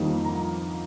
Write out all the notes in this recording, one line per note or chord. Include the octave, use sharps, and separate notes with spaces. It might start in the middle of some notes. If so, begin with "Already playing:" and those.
Already playing: F2 D#3 G3 A#3 D#4
A#5